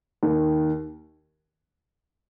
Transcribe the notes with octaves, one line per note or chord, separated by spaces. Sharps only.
D#2 D#3